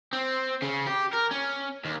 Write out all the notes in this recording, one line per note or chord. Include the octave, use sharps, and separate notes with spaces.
C4
C#3
G4
A#4
C#4
D#2